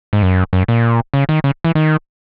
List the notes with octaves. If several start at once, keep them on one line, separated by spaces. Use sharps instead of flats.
G#2
F#2
F#2
A#2
C#3
D#3
C#3
E3
D#3